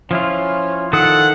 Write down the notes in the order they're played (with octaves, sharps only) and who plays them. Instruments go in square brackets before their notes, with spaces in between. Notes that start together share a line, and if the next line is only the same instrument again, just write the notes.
[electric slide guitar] F3 E4 F4 [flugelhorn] C#4
[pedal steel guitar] D#3 A4 D#6 [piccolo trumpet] F#5